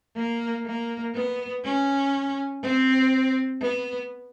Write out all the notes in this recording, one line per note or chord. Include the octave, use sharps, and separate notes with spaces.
A#3
A#3
B3
C#4
C4
B3